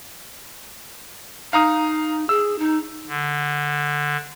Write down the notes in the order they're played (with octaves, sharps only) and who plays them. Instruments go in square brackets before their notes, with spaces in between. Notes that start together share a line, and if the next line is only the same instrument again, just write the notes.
[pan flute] D#4 [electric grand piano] F5 A#5 D#6
[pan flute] G#4 [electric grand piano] E6
[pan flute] D#4
[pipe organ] D3